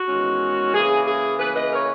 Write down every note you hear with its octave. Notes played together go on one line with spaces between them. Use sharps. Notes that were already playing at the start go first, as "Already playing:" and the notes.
Already playing: F#4
E2 D#3 G#3 C#4
C#3 E3 A#3 G#4
G#4
C#3 E3 A#3 G#4 B4
B4 D#5
A#4 C#5